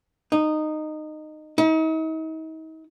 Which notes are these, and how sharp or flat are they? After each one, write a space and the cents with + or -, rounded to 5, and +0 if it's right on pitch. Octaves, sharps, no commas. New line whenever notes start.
D#4 -15
D#4 +40